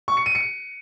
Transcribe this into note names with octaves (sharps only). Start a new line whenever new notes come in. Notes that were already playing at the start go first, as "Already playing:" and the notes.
C#6
C#7
D#7
C#7